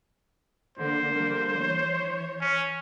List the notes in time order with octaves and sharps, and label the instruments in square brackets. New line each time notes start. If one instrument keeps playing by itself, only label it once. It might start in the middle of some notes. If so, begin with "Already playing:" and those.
[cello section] D3 A#3 [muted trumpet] C5
[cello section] D3 G3 A#3
E3 C#5
[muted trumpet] C#4